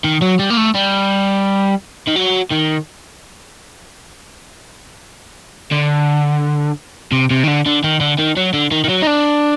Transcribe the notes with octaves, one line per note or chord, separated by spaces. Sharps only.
D#3
F#3
G3
A#3
A3
G3
D#3
F#3
D#3
D3
C3
C3
D#3
D3
D3
D#3
D3
D#3
F#3
D3
D#3
D#3
F#3
D#4
D4